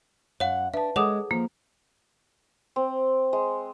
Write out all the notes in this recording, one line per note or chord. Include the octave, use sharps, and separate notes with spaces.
F#2 C#5 F5 F#5
D4 B4 E5 A5
G#3 G#4 A4 C#5 F#5 D6 D#6
F3 A#3
C4
G#3